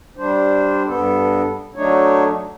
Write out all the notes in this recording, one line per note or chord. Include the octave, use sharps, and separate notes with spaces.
G3 D4 C5
G2 B3 A4
F#3 A3 D4 D#4 C#5